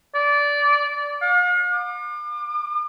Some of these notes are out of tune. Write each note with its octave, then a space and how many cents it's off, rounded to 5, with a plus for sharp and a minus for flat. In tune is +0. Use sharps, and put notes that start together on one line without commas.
D5 -15
F5 +45
D6 +40